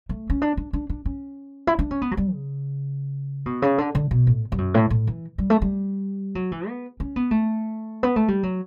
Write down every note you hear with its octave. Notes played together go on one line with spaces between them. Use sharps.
A3
C#4
D4
D4
D4
D4
C#4
E4
D4
C#4
B3
F#3
G3
C#3
B2
C#3
D3
D3
B2
A2
G2
F#2
A2
A2
E3
G3
A3
G3
F#3
E3
B3
C#4
B3
A3
B3
A3
G3
F#3